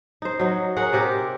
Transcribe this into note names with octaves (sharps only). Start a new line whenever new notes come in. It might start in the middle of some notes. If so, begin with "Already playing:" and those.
D#4 C5
F#3 D#4
G#4 A#4 C#5 F#5
C3 G4 A#4